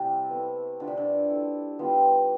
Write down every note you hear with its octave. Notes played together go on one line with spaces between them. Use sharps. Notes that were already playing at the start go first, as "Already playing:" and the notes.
Already playing: C3 G3 A3 C4 E4 G4 A4 D5
B3 E4 A4
D3 D4 F4 B4
C3
D3
E4 A4 E5
G3 B3 F4